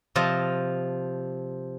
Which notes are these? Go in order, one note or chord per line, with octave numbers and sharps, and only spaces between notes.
C3 F3 F4 D#5 A5